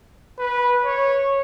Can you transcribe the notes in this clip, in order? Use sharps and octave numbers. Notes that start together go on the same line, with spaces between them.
B4
C#5